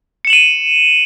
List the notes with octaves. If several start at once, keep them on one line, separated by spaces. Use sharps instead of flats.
C#7 D#7 E7 F#7